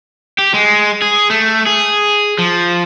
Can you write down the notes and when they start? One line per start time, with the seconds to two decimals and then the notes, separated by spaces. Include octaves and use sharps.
0.39 G4
0.54 G#3
1.02 G#4
1.30 A3
1.67 G#4
2.39 F3